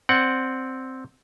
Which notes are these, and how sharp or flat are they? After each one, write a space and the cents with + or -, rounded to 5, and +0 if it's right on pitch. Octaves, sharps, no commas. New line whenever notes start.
C4 +0 D5 +0 F#5 +0